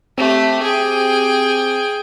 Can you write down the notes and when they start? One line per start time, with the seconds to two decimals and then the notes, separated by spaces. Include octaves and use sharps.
0.18 A3 C4 G4
0.62 G#4 G5